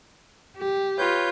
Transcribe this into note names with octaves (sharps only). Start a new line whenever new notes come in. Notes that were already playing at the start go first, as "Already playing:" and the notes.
G4
F4 B4 C#5 G6